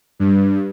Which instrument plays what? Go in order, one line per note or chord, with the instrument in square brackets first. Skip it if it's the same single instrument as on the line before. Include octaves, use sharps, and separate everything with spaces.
[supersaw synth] G2